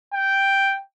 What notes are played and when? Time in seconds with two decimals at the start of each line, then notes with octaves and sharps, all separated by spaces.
0.13 G5